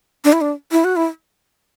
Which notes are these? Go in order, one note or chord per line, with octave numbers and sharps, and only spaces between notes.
D4
E4
D4
E4
F#4
E4